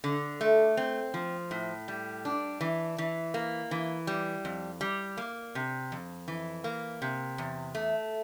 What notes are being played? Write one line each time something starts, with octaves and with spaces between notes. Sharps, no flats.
D3
A3
C4
F3
A2
G3
D4
E3
E3
A#3
E3
G3
F2
G3
A#3
C3
F2
E3
A#3
C3
E2
A3